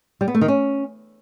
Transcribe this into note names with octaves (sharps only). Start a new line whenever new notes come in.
G3
B3
A3
D#3
C#4